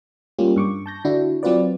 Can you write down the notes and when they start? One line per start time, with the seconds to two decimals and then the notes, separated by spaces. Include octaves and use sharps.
0.39 G3 A#3 C#4 F4 G4
0.56 G2 C#6 D6
0.86 A5 G6 A#6
1.04 D3 D4 E4 F#4
1.43 F#3 C4 F4 B4 D5